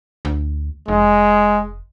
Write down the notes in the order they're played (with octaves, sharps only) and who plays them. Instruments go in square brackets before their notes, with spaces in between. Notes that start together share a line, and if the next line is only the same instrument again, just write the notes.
[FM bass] D2
[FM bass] F1 [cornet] G#3